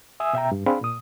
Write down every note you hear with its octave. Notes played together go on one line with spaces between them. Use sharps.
E5 G#5 D#6 E6
B2 E5 G5 A#5
G2
C4 D4 G#4 F5 B5
A#2 D#6